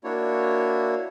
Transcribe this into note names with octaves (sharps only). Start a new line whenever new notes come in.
A#3 D4 E4 F#4 C#5